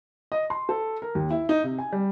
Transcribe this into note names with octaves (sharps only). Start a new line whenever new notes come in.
D#5
C6
A4
A#4
D#2
E4
D#4
C3
G#5
G3